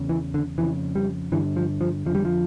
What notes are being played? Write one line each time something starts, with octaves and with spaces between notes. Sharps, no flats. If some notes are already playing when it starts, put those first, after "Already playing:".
Already playing: E2 C#3
E3
D3
F2 C#3 E3
G3
G2 D3 E3
F3
F3
F2 D3 F3 G3
F3